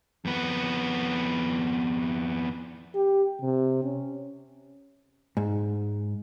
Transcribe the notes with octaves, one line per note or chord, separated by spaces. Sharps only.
F2 B3
G4
C3
C#4
G#2